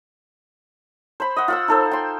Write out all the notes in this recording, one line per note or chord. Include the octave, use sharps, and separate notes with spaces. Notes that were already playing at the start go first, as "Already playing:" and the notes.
C5 B5
D#5 F#5
F4 F#5 E6
D#4 A4 C5
G5 C6